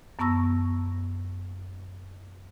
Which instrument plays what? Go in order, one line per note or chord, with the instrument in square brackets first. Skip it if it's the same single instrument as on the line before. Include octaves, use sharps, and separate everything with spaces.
[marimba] F#2 B3 A5 C#6 E6 A#6